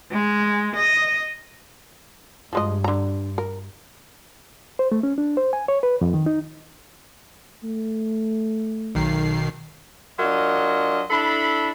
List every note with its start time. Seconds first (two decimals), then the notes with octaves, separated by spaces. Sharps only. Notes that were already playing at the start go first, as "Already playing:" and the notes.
0.12 G#3
0.76 D#5
2.53 G2 F3 G#3 D#5
2.84 D3 A#5
3.38 A#4
4.79 C5
4.92 A3
5.03 C#4
5.18 D4
5.37 C5
5.53 G#5
5.68 C#5
5.83 B4
6.01 F2
6.14 D#3
6.26 D#4
7.64 A3
8.95 B1 D#3 C7
10.19 F#3 D4 F4 A#4 D#5
11.09 D4 E4 A4 B5